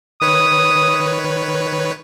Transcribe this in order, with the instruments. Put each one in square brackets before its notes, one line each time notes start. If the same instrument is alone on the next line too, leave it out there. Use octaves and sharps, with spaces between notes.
[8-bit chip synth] D#3 B4 C#5 [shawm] D#6